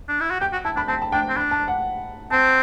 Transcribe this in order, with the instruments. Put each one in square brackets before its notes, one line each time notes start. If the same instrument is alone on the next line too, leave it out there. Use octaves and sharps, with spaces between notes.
[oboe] D4
E4
F#4
[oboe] G4 [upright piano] G5
[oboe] F#4
[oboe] E4 [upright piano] A5
[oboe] D4 [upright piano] B5
[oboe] C4 [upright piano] A5
[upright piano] A5
[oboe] D4 [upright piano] G5
[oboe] C4
[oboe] D4 [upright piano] B5
[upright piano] A5
F#5
[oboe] C4 [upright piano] A5